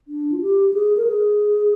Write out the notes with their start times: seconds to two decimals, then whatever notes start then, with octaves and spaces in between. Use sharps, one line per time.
0.08 D4
0.32 F4
0.41 G4
0.74 G#4
0.97 A#4
1.07 G#4